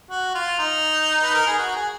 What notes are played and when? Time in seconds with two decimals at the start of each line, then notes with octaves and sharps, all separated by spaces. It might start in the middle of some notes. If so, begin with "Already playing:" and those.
0.10 F#4
0.35 F4
0.59 D#4
1.22 B4
1.34 A#4
1.47 G#4
1.59 F#4
1.76 G#4